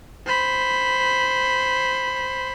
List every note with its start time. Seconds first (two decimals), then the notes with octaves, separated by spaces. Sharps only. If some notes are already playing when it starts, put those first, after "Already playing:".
0.26 C5 B5